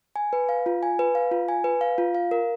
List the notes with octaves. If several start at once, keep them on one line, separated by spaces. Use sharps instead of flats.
G#5
B4
F5
F4
G#5
B4
F5
F4
G#5
B4
F5
F4
F5
A#4